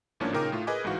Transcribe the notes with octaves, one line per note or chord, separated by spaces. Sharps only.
G#1 A2 F3 A#3 C#4 D4
A#2 C#3 D#4 A#4 G5 D6
A2 A3 F4
G#4 A#4 B4 D#5 G#5 D6
G1 G#2 E3 F#4 F5